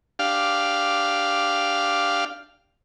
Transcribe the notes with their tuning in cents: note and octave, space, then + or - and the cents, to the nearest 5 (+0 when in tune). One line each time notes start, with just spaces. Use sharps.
D4 +0 G4 +0 F5 +0